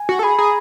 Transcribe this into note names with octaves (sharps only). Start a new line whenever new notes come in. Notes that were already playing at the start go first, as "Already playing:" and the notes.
Already playing: G#5
F#4
A4
G#4 B5
G#4 A#5